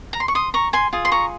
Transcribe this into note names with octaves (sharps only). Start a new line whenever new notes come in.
A#5
C6
C#6
C6 D#6
A#5 C#6
G#5 C6
F4 G#4
C6
A#5 C#6